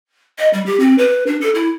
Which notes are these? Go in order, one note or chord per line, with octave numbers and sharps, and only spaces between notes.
D#5
G3
G4
C4
B4
D4
A4
E4